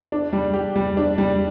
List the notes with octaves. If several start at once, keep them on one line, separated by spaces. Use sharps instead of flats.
D4
G3
G4
G3
D4
G3